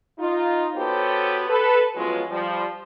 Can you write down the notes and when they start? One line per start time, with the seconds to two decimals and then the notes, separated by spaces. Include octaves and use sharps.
0.19 D#4 F4
0.76 B3 F#4 G4 A4 C5 C#5
1.48 A4 B4
1.96 F3 F#3 G#3 B3 C#4 F4
2.30 F3 G3